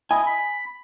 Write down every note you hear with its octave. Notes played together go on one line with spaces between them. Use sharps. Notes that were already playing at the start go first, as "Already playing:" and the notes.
E4 D#5 G#5
B5